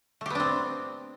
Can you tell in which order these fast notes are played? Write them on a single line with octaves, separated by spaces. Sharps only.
A3 G4 B3 D4 C4